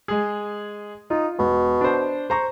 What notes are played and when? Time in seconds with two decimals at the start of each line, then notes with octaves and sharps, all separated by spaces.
0.08 G#3 G#4
1.10 D#4 F4
1.39 E1 B2
1.81 D4 C5
2.30 C5 A#5 C#6